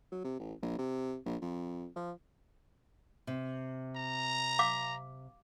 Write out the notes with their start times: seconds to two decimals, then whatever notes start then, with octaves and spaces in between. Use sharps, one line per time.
0.12 F#3
0.25 C3
0.39 A1
0.62 A#1
0.79 C3
1.26 A#1
1.42 F2
1.96 F3
3.27 C3
3.96 A#5
4.59 F5 D6